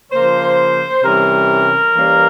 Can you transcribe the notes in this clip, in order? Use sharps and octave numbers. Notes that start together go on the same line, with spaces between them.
C#3 F3 A#3 C5
C3 E3 G3 C#4 A#4
E3 G3 A#3 C#4